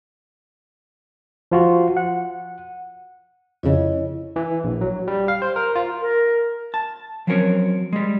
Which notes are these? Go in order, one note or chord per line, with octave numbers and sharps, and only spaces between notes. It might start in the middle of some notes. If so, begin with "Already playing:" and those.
F3 F4 F#4
F#5
F2 C#3 E4 C#5 D#5
E3
A#1
F#3
G3
F5
C5
A#4
F4
A#4
A5
F3 F#3 C4 C#4 A#4 C#5
G3 G#3